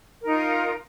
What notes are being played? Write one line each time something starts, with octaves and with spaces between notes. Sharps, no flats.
D#4 F4 A#4